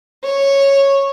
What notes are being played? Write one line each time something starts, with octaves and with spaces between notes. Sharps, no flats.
C#5